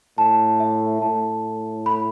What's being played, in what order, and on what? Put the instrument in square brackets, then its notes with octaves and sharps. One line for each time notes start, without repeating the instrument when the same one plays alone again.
[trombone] A2 [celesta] A5
[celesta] E5
[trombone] A2 [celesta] A5
[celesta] B5